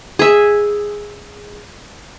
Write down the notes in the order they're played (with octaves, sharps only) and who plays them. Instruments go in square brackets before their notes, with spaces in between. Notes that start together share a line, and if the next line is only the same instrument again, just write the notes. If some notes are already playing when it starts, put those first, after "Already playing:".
[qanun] G#4 E5